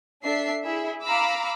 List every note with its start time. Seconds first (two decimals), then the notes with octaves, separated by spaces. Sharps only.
0.22 D4 A4 E5 C7
0.64 E4 G#4 E5
1.03 F5 A#5 B5 D6 E6